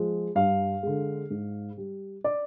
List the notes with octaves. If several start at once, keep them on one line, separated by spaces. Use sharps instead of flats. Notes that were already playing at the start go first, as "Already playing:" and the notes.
Already playing: F3 G#3
G2 F5
D3 G#3
G#2
G3
D5